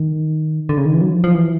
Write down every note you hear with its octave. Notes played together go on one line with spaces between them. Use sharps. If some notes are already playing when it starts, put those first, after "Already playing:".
Already playing: D#3
D3
C#3
D#3
E3
F#3
F3
F3
E3